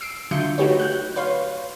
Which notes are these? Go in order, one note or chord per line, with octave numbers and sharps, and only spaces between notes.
E6 C7 D7
D3 F#3 F4 E5 G6 C#7
A3 D#4 F#4 G4 B4 C#5
F#6 G6
B4 C#5 F5 C6